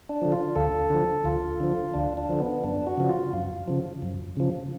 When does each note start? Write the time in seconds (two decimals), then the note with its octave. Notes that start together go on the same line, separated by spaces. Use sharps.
0.09 D4
0.22 D3 F3
0.32 F4
0.56 D2 A4
0.90 D3 F3
1.24 D2 F4
1.60 D3 F3
1.94 D2 D4
2.17 D4
2.29 D3 F3
2.40 B3
2.64 F#2 D4
2.87 F#4
2.97 C#3 F3
3.09 F4
3.33 F#2
3.68 C#3 F3
4.02 F#2
4.37 C#3 F3